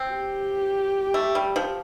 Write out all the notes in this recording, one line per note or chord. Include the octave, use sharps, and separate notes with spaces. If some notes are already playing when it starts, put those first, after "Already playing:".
Already playing: C4
G4
A3
G3
F3